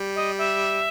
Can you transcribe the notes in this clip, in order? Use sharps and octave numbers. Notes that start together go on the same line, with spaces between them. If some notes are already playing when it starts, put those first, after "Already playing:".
Already playing: G3
D#5
E5